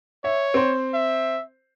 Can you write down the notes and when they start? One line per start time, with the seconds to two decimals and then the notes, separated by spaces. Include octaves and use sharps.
0.24 C#5 E5
0.54 C4 C5
0.94 E5